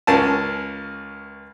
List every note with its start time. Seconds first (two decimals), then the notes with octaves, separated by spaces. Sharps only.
0.07 C#2 C#4 A#4 A5